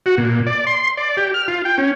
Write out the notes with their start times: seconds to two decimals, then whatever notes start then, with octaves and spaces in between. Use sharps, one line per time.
0.06 F#4
0.18 A#2
0.47 D5
0.67 C6
0.97 D5
1.17 G4
1.34 F6
1.48 F4
1.65 G5
1.78 C#4